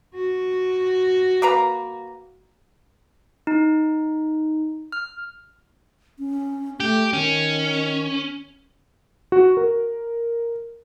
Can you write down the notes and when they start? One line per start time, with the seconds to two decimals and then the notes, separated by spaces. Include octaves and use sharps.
0.15 F#4
1.42 A#3 B4 A#5
3.47 D#4
4.92 F6
6.19 C#4
6.80 A3 G4
7.13 D#3 C#4
9.32 F#4
9.57 A#4